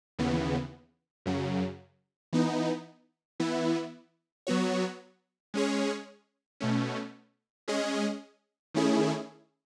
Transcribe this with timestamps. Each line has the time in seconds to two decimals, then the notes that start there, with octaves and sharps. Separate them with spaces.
0.19 D#2 C#3 E3 B3
1.26 F#2 C#3 F#3
2.33 E3 B3 D#4
3.40 E3 B3 E4
4.47 F#3 B3 F#4 C#5
5.54 G#3 C#4 G#4 C#5
6.60 B2 A3 C#4
7.68 G#3 C#4 G#4 D#5
8.74 D#3 A3 C#4 E4 G#4